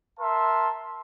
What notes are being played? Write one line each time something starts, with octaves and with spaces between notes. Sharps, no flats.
A#4 E5 A5 C6